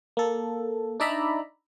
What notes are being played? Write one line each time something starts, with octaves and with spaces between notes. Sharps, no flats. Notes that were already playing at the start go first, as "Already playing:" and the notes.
A#3 A4
D4 D#4 D5 E5 A#5 B5